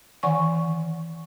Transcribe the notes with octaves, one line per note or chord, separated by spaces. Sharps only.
D#3 E3 F#5 G#5 C#6